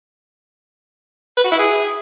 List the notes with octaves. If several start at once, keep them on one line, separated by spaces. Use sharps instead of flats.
B4
F#4
E4
G#4